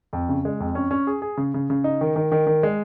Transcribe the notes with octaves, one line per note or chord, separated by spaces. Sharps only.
F2
C#3
G#3
F2
C#4
C#4
G#4
G#4
C#3
C#3
C#3
D#4
D#3
D#3
D#3
D#3
G#3